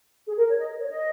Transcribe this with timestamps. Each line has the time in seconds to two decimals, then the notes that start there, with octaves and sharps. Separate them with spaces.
0.26 G#4
0.37 A#4
0.48 C#5
0.58 D#5
0.79 C#5
0.90 D#5